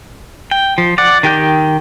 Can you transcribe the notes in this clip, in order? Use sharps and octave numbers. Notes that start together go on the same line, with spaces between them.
G5
F3
D5 F#5
D#3 G4 G5 G6